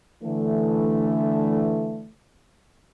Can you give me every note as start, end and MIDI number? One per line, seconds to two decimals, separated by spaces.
0.23 2.09 50
0.23 2.09 52
0.23 2.09 57